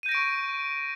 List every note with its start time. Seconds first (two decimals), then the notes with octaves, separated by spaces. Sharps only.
0.03 D#7
0.06 G6
0.09 A#6
0.12 D7
0.15 C#6